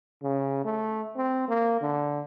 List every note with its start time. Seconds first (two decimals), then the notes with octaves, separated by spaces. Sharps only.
0.23 C#3
0.65 A3
1.17 C4
1.49 A#3
1.81 D3